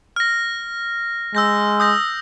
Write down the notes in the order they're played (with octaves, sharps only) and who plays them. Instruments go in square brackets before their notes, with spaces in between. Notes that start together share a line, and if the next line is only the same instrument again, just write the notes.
[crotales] F6 A#6
[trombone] G#3 [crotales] E6 G6 A#6
[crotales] D#6 G6 A#6